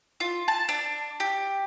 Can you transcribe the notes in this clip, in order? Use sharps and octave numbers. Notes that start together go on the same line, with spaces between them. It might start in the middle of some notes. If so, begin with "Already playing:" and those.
F4
A5
D4
G4